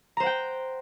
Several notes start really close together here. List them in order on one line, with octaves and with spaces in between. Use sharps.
A#5 C5 F#5 G5